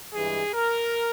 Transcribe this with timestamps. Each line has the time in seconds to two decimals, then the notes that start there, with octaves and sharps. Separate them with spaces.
0.14 G2 E3 G#3 G#4
0.54 A#4